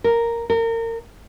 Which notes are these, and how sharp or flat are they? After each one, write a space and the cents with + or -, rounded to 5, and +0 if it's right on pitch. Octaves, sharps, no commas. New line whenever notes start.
A#4 -5
A#4 -30